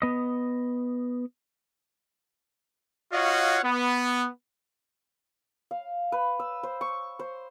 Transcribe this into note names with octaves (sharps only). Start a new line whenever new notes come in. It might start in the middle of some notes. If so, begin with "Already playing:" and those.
B3 D#5
F4 F#4 C#5 D#5 F5 F#5
B3
F5
B4
E6
C5
C#6
C5